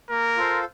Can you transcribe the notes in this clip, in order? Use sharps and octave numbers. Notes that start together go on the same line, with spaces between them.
A#3 A#4
F4 A4 C5 F5